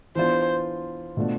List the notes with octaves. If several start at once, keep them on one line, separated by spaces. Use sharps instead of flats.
E3 B3 D4 F4 C5
B2 A3 D4 F4